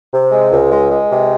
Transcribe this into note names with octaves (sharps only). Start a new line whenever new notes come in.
C3
G#3
C#2
G#3
G#3
C3